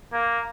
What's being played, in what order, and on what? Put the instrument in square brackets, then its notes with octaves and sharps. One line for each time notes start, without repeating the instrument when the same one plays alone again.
[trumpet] A#3